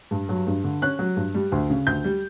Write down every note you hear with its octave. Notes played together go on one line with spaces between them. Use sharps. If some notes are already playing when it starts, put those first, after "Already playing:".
G2
F#3
G2
D3
C#4 F#6
F#3
G2
G3
D2
C#3
D2 G6
G3